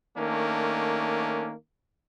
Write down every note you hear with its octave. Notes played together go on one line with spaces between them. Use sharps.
D#3 A3 A#3 C#4 D4